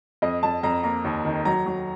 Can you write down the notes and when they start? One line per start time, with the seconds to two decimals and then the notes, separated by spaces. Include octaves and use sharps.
0.22 F2 D#5
0.43 F2 A5
0.63 F2 A#5
0.84 A#3 A#5
1.04 D#2
1.25 D#3
1.45 F#3 A#5
1.66 F#3